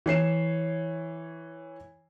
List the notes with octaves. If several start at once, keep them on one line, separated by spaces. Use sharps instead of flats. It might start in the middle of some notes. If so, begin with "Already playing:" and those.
E3 C#5 C7 E7